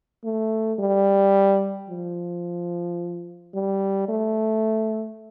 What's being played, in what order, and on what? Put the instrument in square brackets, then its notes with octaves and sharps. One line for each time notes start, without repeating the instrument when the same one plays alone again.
[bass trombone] A3
G3
F3
G3
A3